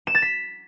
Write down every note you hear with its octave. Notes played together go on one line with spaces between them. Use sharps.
E7
A6
B6